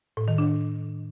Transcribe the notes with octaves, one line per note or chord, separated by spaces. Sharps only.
A2
D#3
D4